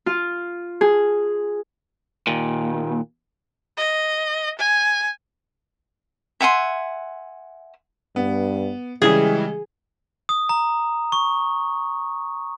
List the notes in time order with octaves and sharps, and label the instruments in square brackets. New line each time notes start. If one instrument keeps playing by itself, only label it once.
[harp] F4
G#4
[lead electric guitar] D#2 A#2
[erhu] D#5
G#5
[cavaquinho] E5 F#5 G#5 C6
[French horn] G2 [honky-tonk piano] B3
[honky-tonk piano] C#3 E3 G3 [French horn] G#3 [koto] G#4
[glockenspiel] D#6
A#5
C#6